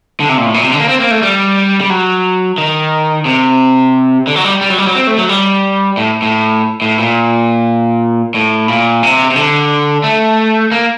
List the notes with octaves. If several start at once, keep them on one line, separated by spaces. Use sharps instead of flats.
D3
C3
A#2
A2
A#2
C3
D3
A#3
C4
A#3
A3
G3
G3
F#3
D#3
C3
D3
F#3
G3
G3
F#3
G3
F#3
C4
A3
F#3
G3
A2
A2
A2
A#2
A2
A#2
C3
C3
D3
A3
A#3